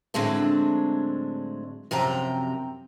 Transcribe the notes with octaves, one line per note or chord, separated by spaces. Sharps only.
A2 D3 F#3 G#3 C4 D4
F#2 C3 F3 G5 A#5